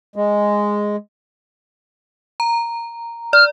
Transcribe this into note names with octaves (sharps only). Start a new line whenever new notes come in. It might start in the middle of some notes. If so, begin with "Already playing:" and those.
G#3
A#5
D5 F6